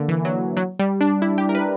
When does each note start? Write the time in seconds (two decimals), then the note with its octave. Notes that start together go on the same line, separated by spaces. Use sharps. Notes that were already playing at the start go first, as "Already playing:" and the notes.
Already playing: D3 A#3
0.08 E3
0.25 F#3
0.57 F#3
0.79 G3
1.01 D4
1.22 E4
1.38 G4
1.49 A#4
1.55 B4